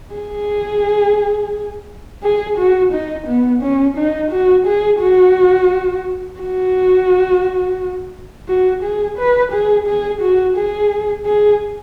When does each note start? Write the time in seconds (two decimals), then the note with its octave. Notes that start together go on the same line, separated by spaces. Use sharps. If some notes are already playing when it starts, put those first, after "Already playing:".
0.15 G#4
2.23 G#4
2.58 F#4
2.93 D#4
3.27 B3
3.62 C#4
3.97 D#4
4.31 F#4
4.66 G#4
5.01 F#4
6.40 F#4
8.49 F#4
8.83 G#4
9.18 B4
9.52 G#4
9.87 G#4
10.22 F#4
10.57 G#4
11.26 G#4